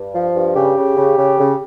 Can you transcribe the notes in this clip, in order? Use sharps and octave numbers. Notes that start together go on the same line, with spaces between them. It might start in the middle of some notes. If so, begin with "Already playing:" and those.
Already playing: G2
F3
G2
C#3 G4
C#3
C#3
C#3
C#3